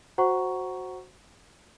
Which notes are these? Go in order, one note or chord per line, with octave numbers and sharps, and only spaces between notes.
F#4 C5 F#5 A#5 C#6